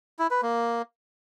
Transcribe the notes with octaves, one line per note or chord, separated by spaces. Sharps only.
E4
B4
A#3